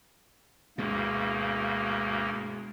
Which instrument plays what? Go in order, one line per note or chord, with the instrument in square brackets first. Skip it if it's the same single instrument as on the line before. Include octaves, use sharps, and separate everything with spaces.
[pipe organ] D2 G2 A#3 [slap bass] B2 G#3